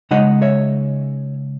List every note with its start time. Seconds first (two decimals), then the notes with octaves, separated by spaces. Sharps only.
0.11 C#3 G#3 D#4 D#5 F#5
0.42 C#5 E5